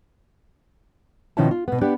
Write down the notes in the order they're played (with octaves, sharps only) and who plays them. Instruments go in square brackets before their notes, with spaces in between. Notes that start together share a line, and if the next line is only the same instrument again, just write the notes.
[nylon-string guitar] B2 D#3 F3 C#4 E4 A5
F4
B2 B3
B3 D4 G4